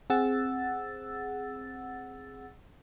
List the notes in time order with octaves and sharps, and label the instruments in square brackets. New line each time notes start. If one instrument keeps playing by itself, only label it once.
[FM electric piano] C4 G#4 F#5 E6 A6